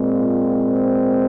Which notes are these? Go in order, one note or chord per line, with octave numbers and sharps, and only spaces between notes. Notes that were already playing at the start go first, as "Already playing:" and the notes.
Already playing: A#2 G#3 C4
F4